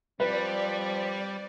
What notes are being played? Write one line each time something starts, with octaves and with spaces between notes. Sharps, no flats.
F3 G3 C4 B4 D5